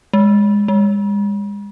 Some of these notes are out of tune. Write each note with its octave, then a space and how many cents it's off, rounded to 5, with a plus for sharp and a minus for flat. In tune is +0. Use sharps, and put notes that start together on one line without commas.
G#3 -15
G#3 -40